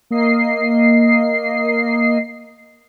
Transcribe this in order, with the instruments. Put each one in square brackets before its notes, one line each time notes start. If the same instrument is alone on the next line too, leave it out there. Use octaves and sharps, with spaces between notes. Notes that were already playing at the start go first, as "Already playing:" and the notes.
[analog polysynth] A#3 D#5 C7